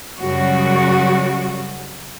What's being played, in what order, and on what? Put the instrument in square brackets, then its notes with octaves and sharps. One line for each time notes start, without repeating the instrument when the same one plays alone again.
[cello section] F#2 C#3 G3 F#4